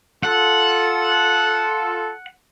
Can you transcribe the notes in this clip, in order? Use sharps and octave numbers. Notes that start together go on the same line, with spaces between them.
F4 A4 F#5